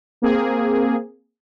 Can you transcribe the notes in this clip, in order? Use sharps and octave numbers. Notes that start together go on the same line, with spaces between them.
A#3 C4 G#4